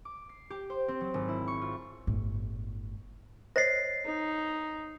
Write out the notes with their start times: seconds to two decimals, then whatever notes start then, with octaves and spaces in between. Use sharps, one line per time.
0.05 D6
0.29 C7
0.50 G4
0.70 C5
0.88 C4
1.01 F#3
1.14 G#1
1.28 E4
1.47 C#6
1.62 F4
2.07 G1 A2
3.56 C5 C#5 D#5 A#6 C7
4.05 D#4